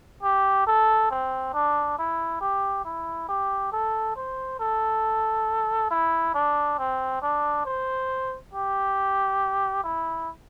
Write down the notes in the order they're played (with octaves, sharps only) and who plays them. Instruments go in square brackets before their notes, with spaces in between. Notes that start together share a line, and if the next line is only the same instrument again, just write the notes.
[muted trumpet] G4
A4
C4
D4
E4
G4
E4
G4
A4
C5
A4
E4
D4
C4
D4
C5
G4
E4